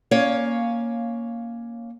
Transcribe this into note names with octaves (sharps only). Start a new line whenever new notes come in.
A#3 C#4 C#5 F5